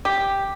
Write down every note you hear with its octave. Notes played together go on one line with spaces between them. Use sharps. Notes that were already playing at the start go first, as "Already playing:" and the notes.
G4